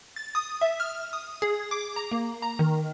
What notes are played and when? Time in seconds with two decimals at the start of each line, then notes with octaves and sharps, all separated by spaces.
0.16 A6
0.35 D#6
0.61 E5
0.80 F6
1.13 D#6
1.42 G#4
1.71 D6
1.96 A#5
2.11 A#3
2.42 A#5
2.59 D#3